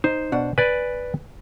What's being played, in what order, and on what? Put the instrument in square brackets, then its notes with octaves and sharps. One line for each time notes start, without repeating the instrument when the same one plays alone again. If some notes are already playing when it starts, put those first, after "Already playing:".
[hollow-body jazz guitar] D#4 [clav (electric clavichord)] C5
[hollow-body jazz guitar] B2 D4 F#5
[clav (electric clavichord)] B4 D5 [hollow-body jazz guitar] G#5